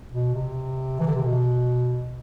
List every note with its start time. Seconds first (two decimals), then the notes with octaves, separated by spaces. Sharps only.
0.12 B2
0.34 C3
1.00 E3
1.07 D3
1.16 C3
1.24 B2